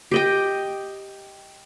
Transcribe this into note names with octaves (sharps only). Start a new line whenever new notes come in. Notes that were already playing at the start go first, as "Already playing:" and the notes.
G4 D#5 G5